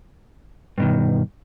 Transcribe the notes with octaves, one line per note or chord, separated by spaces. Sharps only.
G2 B2 D#3